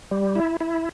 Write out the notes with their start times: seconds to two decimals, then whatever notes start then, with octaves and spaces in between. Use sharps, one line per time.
0.11 G3
0.35 E4
0.61 E4